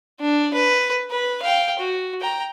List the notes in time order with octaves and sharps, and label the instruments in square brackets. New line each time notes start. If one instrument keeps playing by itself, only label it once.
[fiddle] D4
B4
B4
F5 G5
F#4
G5 A#5